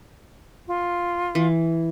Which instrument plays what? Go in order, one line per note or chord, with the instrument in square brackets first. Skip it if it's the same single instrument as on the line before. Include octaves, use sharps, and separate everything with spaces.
[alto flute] F4
[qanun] E3